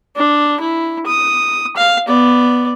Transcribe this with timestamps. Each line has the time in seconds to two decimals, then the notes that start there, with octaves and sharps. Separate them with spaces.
0.16 D4
0.60 E4
1.06 D#6
1.77 F5
2.08 B3 D5